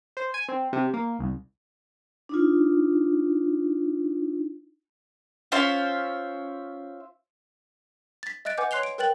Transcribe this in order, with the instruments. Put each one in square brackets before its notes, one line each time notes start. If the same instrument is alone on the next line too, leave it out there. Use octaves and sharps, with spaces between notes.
[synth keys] C5
G#5
C4
C3
A#3
C2
[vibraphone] D4 D#4 F4
[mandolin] C#4 F4 C5 E5
[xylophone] A6 B6
D#5 E5 F#6 A6 D7
B4 D#5 F#5 G#5 D6 G6
C#5 C6 F#6 C7 F7 G7
D7
A#4 B4 G5 F#6 A6 F#7